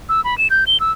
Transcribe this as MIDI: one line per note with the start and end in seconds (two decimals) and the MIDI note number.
0.09 0.23 88
0.24 0.37 83
0.38 0.48 100
0.50 0.64 91
0.67 0.80 103
0.80 0.92 88